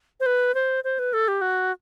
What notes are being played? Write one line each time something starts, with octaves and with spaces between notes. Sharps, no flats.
C5
B4
C5
C5
B4
A4
G4
F#4